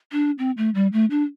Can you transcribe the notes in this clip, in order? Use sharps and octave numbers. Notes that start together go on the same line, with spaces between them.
D4
C4
A3
G3
A3
D4